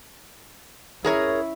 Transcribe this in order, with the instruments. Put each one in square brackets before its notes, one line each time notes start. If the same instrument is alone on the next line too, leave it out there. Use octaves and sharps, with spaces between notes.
[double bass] C#4 E4 [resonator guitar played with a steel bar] G#4 A#4 C#5